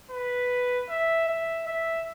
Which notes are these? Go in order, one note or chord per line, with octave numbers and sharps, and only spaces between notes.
B4
E5
E5
E5